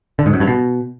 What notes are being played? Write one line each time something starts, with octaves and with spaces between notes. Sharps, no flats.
D3
G#2
F#2
G2
B2